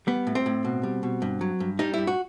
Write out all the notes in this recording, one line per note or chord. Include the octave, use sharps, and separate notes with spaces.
G3 B3
A2
C4
A2
B2
G3
B2
G2
F#3
G2
G3 D#4
G2 E4
F#4